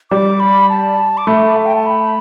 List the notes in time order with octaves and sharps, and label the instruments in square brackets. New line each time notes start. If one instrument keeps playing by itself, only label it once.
[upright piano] G3 [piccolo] D6
[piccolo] B5
A5
D6
[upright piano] A3 [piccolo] B5
[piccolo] E5
G5
A5
B5